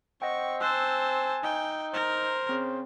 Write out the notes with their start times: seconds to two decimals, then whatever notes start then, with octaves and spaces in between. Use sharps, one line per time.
0.22 C4 D#5 F#5 G5 C#6
0.61 C5 G#5 A5 E6 F#6
1.43 D#4 G5
1.94 A#4 C5
2.49 C#3 C4